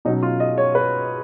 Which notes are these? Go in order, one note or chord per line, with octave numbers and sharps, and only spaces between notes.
B2 F#3 C#4 D#4
F4
D#5
C#5
B4